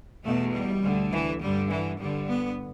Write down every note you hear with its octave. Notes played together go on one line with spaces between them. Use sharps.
E2 B2 A3
G3
D2 D3
E3
G2 D3 G3
E3
G2 D3 G3
B3